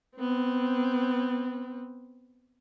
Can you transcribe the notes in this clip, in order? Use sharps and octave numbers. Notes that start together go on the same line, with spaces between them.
B3 C4